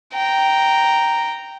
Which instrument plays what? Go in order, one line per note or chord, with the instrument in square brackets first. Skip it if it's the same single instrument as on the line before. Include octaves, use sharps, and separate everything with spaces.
[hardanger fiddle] G5 A#5